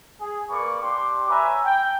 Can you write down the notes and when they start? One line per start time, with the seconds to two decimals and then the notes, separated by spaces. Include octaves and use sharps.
0.21 G#4
0.50 A#3 B4 D5 C#6
0.82 D4 G4 C6 D6
1.29 B4 C#5 E5 G#5 A#5
1.64 G5